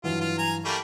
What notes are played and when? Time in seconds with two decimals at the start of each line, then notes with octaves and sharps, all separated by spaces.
0.04 G2 E3 F#3 F4
0.21 F4
0.38 G#5 A#5
0.65 G3 A3 A#3